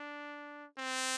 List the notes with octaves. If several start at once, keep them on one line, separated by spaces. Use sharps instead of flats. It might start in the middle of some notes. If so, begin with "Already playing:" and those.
Already playing: D4
C4